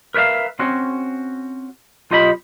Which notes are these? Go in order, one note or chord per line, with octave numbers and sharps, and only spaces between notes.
A#4 B4 C#5 E5 F5
C4 C#4 F#4
B1 F4 G4 D#5 A#5 B5